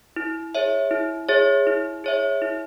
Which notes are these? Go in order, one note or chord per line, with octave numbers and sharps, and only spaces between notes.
E4
G#4 C#5 E5
E4
G#4 C#5 E5
E4
G#4 C#5 E5
E4